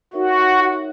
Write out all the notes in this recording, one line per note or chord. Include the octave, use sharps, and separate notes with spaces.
D#4 F#4 A#4 C#5 E5